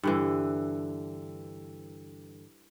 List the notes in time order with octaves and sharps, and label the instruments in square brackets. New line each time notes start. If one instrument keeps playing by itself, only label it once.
[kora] G2 D3 E3